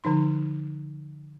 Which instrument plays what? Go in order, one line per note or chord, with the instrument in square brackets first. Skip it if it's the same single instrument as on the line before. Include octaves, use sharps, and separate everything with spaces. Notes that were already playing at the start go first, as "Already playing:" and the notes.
[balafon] D3 F3 D#4 C6